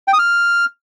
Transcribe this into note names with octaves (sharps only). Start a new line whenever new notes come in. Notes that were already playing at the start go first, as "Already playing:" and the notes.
G5
D#6
F6